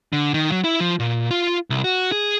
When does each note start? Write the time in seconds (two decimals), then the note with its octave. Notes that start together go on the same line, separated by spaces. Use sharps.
0.13 D3
0.34 D#3
0.52 F#3
0.64 E4
0.80 F3
0.99 A#2
1.31 F4
1.70 C2
1.84 F#4
2.12 G#4